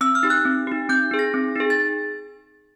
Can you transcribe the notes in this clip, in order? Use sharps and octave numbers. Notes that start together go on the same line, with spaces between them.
C4 E6
F6
D#4 G4
F#6
C4
D#4 G4
C4 G6
D#4 G#4
A#6
C4
D#4 G#4
A6